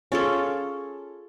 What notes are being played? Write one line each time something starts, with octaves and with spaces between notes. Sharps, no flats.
C#4 F4 G#4 A4